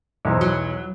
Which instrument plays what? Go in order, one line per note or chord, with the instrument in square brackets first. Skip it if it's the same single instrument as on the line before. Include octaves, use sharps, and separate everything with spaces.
[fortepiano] B1 E2 C5
[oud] F#3